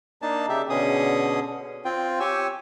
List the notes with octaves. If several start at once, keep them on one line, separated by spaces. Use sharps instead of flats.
A#3 D4 D#4 A5
C#3 G4 E5
B2 D3 C#4 G#4 D#6
C4 F4 G5
G4 C#5 G#5 E6